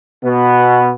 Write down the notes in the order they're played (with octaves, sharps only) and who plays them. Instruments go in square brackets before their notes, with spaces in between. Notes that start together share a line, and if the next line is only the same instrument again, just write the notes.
[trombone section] B2 B3